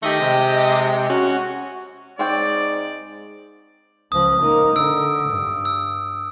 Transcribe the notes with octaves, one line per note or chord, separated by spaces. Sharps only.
D#3 A3 G4 D#5 A#6
C3 G#3
C#4 F#4
G#2 C4 C#5 D5 G5
C#2 F3 D#6
A#3 D#4
D3 E6 D7
G2
E6